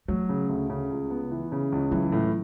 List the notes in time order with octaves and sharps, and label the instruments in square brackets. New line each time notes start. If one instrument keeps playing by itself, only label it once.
[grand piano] F#3 [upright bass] A3
[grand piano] C#3
D2
C#3
C#2
B3
E3
C#3
C#2
[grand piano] E3 [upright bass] F#3
[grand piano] A2